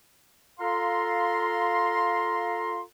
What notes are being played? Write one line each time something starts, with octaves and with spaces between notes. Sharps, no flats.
F4 A4 F5 A#5 C6